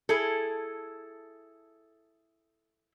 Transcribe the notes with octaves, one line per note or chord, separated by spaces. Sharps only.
E4 G#4 A4